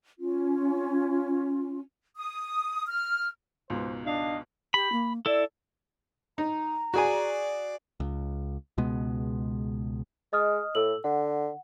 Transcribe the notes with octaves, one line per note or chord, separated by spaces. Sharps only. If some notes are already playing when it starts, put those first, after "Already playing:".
C#4 F4
D#6
F6
C#2 G#2 B2 C5
D4 D#5 F5
G4 B5
A#3
E4 A4 D5
D#4 A#5
F#4 G#4 D5 G#5
C#2
C#2 B2 G#3 B3
G#3 D#5 D#6 F6
A2 A4 E6 F#7
D3 F#5